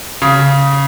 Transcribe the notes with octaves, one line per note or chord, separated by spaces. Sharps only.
C#3